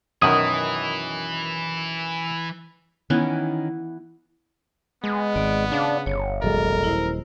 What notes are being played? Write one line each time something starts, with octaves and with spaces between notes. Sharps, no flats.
F#2 B2 D#3 E3 D#6
D#3 E3 B3 C#4
G#3 B3
G#1 D5
C#3 D4 F5
G1 C#5
D#1 F#3 G#3 A4 A#4
E4 C5